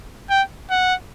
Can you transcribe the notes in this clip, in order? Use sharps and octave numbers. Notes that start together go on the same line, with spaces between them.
G5
F#5